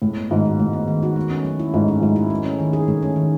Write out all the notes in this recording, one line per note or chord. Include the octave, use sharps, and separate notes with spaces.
A2 G#3
B3
G#2 D#3
F#4
A2 G#3
B3
D#3
F#4
A3
C#4
F#3
E4
G#2 A3
C#4
G#2 F#3
E4
A3
C#4
D#3
G#4
A2 A3
C#4
D#3